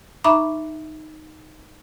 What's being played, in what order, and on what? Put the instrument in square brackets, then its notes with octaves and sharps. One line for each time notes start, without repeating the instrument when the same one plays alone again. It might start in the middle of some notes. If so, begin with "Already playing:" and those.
[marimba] D#4 E5 A#5 B5 C#6 D6